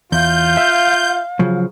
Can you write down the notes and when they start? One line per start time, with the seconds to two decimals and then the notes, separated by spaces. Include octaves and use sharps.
0.12 E2 F4 F5 G6
0.57 E5
1.39 C#3 F3 F#3